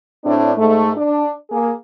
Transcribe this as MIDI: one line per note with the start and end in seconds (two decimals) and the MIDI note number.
0.24 0.52 45
0.24 0.52 60
0.24 0.52 62
0.57 0.91 44
0.57 0.91 57
0.97 1.30 62
1.51 1.71 58
1.51 1.71 68